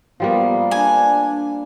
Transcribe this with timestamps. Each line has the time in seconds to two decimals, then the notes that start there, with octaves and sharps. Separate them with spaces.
0.20 F3 G3 A#3 B3
0.71 D4 G#5